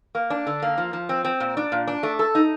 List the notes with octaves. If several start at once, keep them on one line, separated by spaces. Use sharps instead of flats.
A#3
D4
D3
A#3
F3
F3
C4
C4
A#2
D4
A#2
D4
A3
A4
D#4